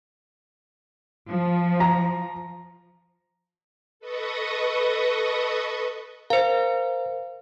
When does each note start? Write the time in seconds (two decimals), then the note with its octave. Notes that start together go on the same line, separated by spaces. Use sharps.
1.29 F3
1.80 A#5
4.00 A4 B4 D#5 C#6 D#6
6.30 A#4 C5 F5